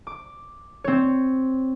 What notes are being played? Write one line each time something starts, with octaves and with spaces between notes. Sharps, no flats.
D6
C4 C#5